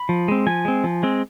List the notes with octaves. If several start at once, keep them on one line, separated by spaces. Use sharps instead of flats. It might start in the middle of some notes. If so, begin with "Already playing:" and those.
Already playing: B5
F3
G#3 C4
F3 G#5
G#3 C4
F3
G#3 C4